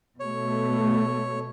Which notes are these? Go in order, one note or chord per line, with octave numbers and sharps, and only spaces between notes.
B2 A3 C#5